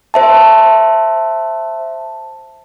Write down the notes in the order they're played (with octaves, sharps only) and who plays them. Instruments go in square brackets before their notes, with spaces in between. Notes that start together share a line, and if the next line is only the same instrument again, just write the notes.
[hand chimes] C5 E5 A5